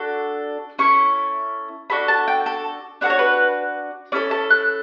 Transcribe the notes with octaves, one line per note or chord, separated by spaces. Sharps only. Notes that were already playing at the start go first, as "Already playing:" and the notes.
Already playing: D4 F#4 A4
C#4 E4 A4 C#6
D4 F#4 A4 B5
A5
G5
A4
D4 F#4 A4 B4
C#5
B4
C#4 E4 A4 D5
A5
F#6